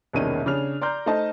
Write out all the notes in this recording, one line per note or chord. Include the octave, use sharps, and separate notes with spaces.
E1 C2 D#3 A#3 C#4 D#7
C#3 D4 G#4 F6 F7
D5 A#5 C6 F6 G6
A3 D#4 C5 D#5 A5